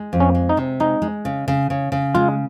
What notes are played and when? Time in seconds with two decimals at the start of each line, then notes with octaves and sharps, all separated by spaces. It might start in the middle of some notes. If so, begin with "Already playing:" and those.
Already playing: G#3
0.13 F2
0.20 C#4
0.35 G#3
0.49 D#4
0.57 C3
0.80 G#3 D#4
1.02 G#3
1.25 C#3
1.48 C#3
1.70 C#3
1.92 C#3
2.15 G#3 F4